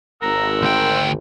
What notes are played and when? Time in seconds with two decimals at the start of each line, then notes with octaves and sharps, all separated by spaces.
0.22 G#1 A#4 F#5 A#5 E6
0.62 D2 C5 G5